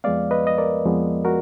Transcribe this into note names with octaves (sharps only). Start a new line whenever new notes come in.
F2 F3 G#3 B3 D5 F5
B4 D#5
D#5
A#4 D5
F2 F3 G#3 B3
F#4 A#4